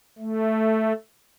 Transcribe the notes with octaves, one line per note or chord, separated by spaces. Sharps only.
A3